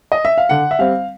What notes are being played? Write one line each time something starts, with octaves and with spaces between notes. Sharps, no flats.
D#5
E5
F5
D3 F#5
E5
G3 C4 F5